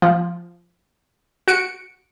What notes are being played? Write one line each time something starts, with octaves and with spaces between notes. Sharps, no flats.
F3
F#4 C#7 D7